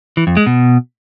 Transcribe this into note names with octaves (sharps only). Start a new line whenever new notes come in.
E3
F2
G#3
B2